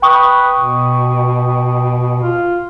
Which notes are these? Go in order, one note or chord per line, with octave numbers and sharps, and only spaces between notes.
B4 G5 C#6 D#6
B2
F4